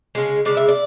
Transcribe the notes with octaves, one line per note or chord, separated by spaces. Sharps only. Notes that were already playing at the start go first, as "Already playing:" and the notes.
C#3 G#3
C#3 G#3 D5
E5
D5